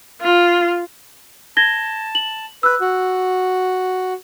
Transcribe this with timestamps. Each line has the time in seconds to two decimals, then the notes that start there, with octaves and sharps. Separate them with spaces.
0.21 F4
1.57 A5 G#6 A#6 G7
2.15 F#7
2.63 B4 E6 F#6
2.81 F#4